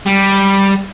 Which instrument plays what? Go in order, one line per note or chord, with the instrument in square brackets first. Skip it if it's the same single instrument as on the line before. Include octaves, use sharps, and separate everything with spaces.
[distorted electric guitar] G3